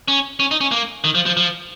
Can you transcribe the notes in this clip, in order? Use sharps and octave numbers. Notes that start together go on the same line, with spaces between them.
C#4
C#4
D#4
C#4
A#3
D#3
F3
F3
F3